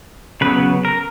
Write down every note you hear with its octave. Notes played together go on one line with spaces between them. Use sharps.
C#3 F#3 B3 B4
A#4